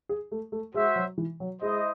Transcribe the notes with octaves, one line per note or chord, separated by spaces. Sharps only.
G#4
A3
A3
G#3 F#4 C5 E5
F#3
E3
F#3
G#3 E4 C5 D#5